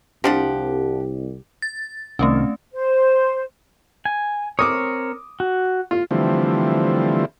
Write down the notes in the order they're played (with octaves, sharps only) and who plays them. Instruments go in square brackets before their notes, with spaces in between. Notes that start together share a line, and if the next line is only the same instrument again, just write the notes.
[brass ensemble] C2 [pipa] F3 D4 F#5 [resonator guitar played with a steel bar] G4
[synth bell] A6
[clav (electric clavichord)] C2 D#3 [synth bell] A3 C4 C#4
[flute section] C5
[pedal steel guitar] G#5
[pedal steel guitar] C4 A#4 C#5 [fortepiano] D6 D#6
[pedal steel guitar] F#4
[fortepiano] F4
[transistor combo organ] D3 E3 F3 G3 A3 C4